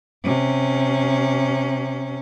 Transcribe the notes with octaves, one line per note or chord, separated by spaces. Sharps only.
C3 C#4